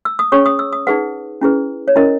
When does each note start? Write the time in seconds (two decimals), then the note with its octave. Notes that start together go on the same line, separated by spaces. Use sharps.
0.05 E6
0.19 D#6
0.32 C#4 G#4 C#5 C#6
0.46 D#6
0.59 E6
0.73 D#6
0.87 D#4 G#4 B4 F#5
1.41 C#4 E4 G#4 B4
1.88 C#5
1.96 C#4 E4 A#4 D#5